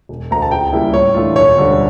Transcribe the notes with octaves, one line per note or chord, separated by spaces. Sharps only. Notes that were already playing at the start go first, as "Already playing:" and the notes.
E1
D2 D3 A#5
A5
C#2 G5
C#3 G3 A#3 E4
A2 C#5
E3 A3 D4 F4
E1 C#5
D2 D3 G3 C#4